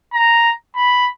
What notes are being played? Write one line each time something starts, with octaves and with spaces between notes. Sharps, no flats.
A#5
B5